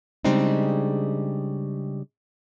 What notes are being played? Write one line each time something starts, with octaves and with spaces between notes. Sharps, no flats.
C#3 G3 G#3 C4 D4 D#4